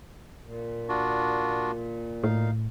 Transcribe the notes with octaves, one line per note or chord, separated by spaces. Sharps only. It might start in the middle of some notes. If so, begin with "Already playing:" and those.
A#2
D4 F4 F#4
A2 D#4 F5